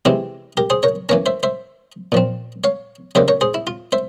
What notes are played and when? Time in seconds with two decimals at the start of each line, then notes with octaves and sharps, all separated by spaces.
0.05 C3 E3 G#3 C4 E4 G4
0.57 G4 A#4
0.70 G#4 C5
0.83 A#4 C#5
1.09 E3 A#3 C#4 A#4 C#5
1.26 C5 E5
1.43 C5 E5
2.12 A#2 F3 C4
2.64 C#5 F5
3.15 C#3 G3 A#3 C5 E5
3.28 A#4 C#5
3.41 G#4 C5
3.54 E4
3.67 F4
3.92 C5 E5